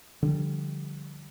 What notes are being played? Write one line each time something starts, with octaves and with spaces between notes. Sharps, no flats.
D3 F3 G3